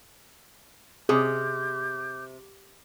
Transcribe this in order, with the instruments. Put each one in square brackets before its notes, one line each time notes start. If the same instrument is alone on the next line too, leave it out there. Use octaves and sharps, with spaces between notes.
[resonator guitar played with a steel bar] C3 [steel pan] G#4 D#6 [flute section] D6 G6